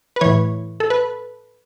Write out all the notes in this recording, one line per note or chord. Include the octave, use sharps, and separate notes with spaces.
B4
A2 E3 C#5
A4
B4